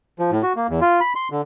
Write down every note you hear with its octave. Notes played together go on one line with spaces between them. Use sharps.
F3
A2
F#4
A#3
E2
F4
B5
C6
D3